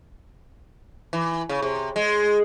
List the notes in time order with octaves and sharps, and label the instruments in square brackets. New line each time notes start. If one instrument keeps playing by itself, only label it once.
[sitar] E3
C#3
C3
G#3